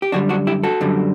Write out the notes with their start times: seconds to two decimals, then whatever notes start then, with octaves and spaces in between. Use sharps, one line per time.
0.02 G4
0.12 F#2 D3 G3 D4 F#4
0.29 D4 F#4
0.47 E4 G4
0.63 F#4 A4
0.81 F#2 D3 G3